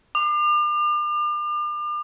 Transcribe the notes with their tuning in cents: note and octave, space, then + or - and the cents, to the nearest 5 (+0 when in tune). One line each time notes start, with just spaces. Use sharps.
D6 +40